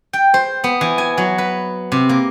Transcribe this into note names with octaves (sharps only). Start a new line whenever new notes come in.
G5
C5
B3
E3
G#5
F#3
B4
C3
A#3